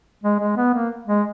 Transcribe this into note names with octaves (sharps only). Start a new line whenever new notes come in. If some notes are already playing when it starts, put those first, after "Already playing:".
G#3
G#3
B3
A#3
G#3